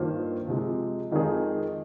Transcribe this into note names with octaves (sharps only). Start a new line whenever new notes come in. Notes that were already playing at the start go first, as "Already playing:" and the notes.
Already playing: G2 D#3 A#3 F4 C5
C3 F3 G#3
F2 D#3 G#3 D#4 G#4